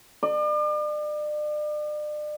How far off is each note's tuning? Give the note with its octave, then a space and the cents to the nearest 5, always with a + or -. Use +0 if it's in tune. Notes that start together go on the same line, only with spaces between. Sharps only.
D5 +40